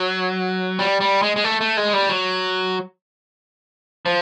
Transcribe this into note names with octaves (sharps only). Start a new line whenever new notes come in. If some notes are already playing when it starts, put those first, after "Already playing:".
Already playing: F#3
G3
G3
G#3
G#3
A3
A3
G#3
G3
F#3
F3